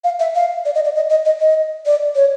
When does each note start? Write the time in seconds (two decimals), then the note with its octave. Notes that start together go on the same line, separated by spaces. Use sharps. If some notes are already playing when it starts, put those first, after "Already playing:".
0.04 F5
0.19 E5
0.35 F5
0.65 D5
0.75 D#5
0.85 D5
0.95 D#5
1.10 D#5
1.25 D#5
1.40 D#5
1.86 D5
2.15 C#5